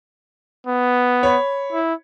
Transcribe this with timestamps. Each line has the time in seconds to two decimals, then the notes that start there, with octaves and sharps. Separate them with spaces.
0.66 B3
1.23 C#5 B5
1.72 E4